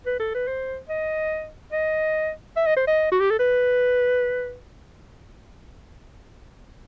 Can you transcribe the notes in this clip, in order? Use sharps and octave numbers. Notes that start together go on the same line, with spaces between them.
B4
A4
B4
C5
D#5
D#5
E5
D#5
C5
D#5
F#4
G4
A4
B4